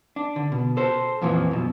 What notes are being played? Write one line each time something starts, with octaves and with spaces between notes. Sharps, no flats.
D4
D3
B2
A4 C5
F2 A#2 E3 F3
F#2 B2